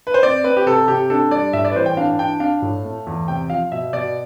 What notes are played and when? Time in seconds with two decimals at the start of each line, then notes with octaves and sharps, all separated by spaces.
0.07 B4
0.14 C5
0.23 C4 D5
0.44 C4 B4
0.57 G4
0.66 C3 A4
0.88 C3 G4
1.10 D4 A4
1.31 G3 D5
1.53 A2 E5
1.65 D5
1.71 B4
1.75 E3 C5
1.86 G5
1.97 D4 F5
2.19 D4 G5
2.40 D4 F5
2.62 A2
2.85 A3
3.07 E2
3.28 C3 G5
3.49 F3 F5
3.72 B2 E5
3.93 B2 D5